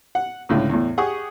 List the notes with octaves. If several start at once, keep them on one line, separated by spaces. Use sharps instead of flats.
F#5
C#2 A2 D3
E2 A2
G4 G#4 F#5 C#6 D#6